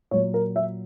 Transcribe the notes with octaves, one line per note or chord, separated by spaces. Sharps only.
A#2 F#3 C#5
A#4
E5